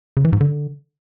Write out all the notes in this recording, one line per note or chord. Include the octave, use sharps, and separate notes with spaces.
C#3
E3
G#2
D3